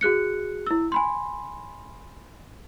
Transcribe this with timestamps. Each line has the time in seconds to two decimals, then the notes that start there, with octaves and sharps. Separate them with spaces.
0.01 F#4 G#4 F#6 C#7
0.67 E4 E6
0.92 G#5 B5 C6